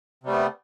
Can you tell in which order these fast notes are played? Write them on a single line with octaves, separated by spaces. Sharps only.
C3 G3 A3 B3